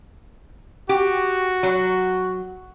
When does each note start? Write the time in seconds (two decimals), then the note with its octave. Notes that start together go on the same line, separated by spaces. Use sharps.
0.89 F#4 G4
1.63 F#3